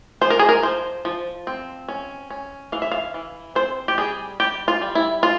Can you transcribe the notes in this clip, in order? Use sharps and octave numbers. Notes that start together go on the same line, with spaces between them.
F3 C5
A#4
G#4
A#4
F3 C5
F3
C4
C#4
C#4
E3 F5
E5
F5
E3
C4 C5
G4
G3 G#4
G3 G4
F4
G3
E4
F4